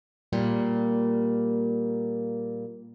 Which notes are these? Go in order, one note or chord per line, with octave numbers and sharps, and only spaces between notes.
A#2 G3 A#3